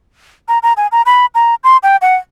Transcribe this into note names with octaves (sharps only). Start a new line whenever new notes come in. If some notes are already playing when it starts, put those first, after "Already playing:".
A#5
A#5
G#5
A#5
B5
A#5
C6
G5
F#5